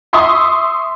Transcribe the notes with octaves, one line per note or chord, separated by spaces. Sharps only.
E5 C6 C#6 D#6 E6